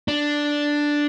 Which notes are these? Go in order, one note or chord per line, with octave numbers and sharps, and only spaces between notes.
D4